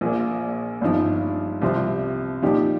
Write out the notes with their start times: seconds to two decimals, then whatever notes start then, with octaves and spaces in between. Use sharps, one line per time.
0.01 A#1 A#2 A#3
0.81 G1 G2 F3 D#4
1.62 C2 C3 F3 C4
2.42 A#2 F3 D#4 G4